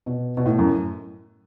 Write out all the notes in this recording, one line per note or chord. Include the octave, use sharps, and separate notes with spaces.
B2
B2
A2
F#2